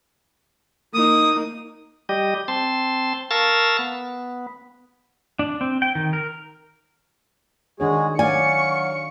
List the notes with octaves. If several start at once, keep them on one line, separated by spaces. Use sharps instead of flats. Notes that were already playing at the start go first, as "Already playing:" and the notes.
A#3 D#4 D#6
G3 G4 D#5
C4 A5 C6
A#4 F5 A5 C#6 E6 A6
B3
D4
C4
G5
D#3
A#4
D#3 G#3 D4 F#4 G#4 C#5
F#3 D5 F5 G#5 C#6 C#7